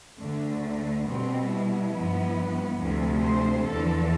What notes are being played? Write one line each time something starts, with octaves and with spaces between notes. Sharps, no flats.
D2 D3 A3
B2 G3 B3 C4
E4
G2 F3 B3
D2 C3 F3 A3
C5
E2 D3 F3 A4